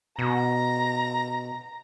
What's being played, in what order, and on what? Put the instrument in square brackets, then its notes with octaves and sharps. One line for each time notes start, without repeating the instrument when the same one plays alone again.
[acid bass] B2 [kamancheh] A#5